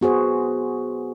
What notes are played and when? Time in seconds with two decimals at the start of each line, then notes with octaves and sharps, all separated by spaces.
0.01 B3 F#4 G#4 C5